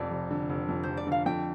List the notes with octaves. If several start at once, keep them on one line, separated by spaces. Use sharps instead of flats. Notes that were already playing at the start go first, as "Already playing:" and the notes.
Already playing: F1 F2 D5
F1
D3
F1
F2
F1 C5
D5
D3
F5
F2 G5